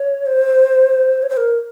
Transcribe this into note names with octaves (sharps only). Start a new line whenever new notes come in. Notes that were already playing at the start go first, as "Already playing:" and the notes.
Already playing: C#5
C5
C#5
C5
A#4